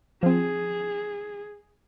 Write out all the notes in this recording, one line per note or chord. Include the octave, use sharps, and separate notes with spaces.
F3 C4 G#4